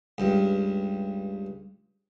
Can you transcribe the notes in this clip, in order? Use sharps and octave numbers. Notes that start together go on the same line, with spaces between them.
C#2 G2